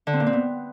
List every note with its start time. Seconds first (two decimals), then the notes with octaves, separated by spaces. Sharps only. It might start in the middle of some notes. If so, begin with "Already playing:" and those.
0.07 D3
0.13 C4
0.20 A#2
0.26 C4
0.33 B3